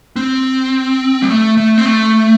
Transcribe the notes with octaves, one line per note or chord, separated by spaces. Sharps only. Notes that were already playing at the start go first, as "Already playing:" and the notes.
C4
G3
A3
A3
C4
A3